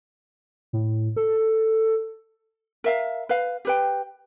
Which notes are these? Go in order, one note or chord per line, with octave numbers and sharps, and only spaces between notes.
A2
A4
A#4 E5 F5
B4 F5
G4 B4 G5